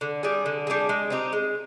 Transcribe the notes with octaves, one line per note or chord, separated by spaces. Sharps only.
D3
G3 D4 G#4
D3
G3 D4 G#4
G#3
C4 D#4 G4
G#3